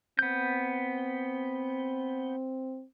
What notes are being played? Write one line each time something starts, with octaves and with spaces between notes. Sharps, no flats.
B3 C4 G6